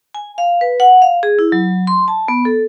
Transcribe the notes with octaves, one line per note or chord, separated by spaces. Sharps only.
G#5
F5
B4
F#5
F5
G#4
E4
F#3
C6
A5
B3
A4